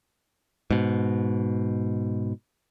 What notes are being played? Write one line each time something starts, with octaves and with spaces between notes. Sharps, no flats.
G#2 B2